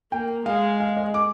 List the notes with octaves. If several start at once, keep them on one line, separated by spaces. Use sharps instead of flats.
A#3 G5
G#3 F5
F5
D#5
D6